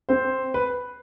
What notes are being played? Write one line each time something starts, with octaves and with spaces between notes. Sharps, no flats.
C4 C5
B4